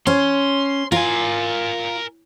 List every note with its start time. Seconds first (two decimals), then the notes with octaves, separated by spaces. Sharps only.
0.07 C#4 C6
0.92 F4 A#4 G#5